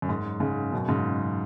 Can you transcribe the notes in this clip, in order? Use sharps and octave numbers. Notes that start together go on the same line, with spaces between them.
F#2
G#2
G#2 C#3
F#2 B2
G#2 C#3